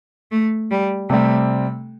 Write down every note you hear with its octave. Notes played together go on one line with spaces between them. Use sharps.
A3
G3
C3 G3 A3 C4